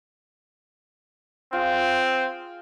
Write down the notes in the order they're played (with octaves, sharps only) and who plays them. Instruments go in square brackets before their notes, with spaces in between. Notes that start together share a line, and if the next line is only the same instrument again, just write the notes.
[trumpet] C4 [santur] F4 G#4